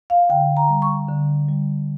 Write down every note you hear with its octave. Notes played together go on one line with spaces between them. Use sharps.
F5
D3 G5
A#5
G3
C#6
D3
G3